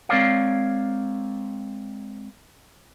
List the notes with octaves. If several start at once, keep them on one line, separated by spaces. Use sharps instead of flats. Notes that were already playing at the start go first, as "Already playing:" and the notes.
G#3 C4 A#4 C#5 D5 F5